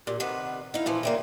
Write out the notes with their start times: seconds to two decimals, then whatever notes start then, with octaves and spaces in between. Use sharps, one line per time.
0.07 A#2 G4
0.20 C3 D#3 B4 F#5
0.74 D#4 E4 F5
0.86 A#2 E3 F3
1.03 C#3 G3 A#3 E5